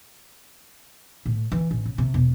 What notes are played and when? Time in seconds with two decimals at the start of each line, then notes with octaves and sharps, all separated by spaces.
1.26 A2
1.52 E3
1.71 A1
1.85 C#3
1.98 C3
2.14 E1